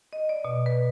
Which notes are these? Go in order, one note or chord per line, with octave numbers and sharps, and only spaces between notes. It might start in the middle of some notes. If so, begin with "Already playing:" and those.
D#5
D5
B2
B4